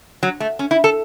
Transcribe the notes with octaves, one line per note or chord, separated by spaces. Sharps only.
F#3
A3
C#4
E4
A4